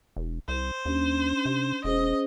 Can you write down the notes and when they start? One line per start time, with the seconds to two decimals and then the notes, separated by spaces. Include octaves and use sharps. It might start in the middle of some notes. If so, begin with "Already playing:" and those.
0.16 E1
0.48 C2 C5
0.85 D#2 C#4 D4
1.45 C3
1.84 E1 C#4 G#4 C5 D#5